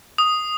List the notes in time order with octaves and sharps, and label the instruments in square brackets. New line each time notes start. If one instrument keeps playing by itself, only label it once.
[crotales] D#6